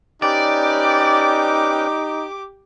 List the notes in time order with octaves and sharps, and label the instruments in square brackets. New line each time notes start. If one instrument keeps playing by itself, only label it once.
[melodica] C#4 B4 G5 [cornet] D#4 [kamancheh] G4 D6 [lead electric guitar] D5